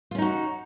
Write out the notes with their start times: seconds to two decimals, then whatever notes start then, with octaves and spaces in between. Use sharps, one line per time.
0.11 F4
0.15 C#4
0.18 D#4
0.22 F#4